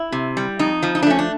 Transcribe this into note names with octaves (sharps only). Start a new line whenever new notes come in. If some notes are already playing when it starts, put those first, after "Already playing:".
Already playing: E4
C3
G3
F2 D#4
F3
D#4
D4
A3 C#4
D4